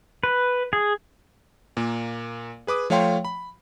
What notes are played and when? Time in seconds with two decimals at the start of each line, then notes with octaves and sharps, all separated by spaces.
0.23 B4
0.73 G#4
1.77 A#2 A#3
2.67 G#4 B4 D6 D#6
2.90 F3 A3 C#5 F5 G5 C6
3.25 B5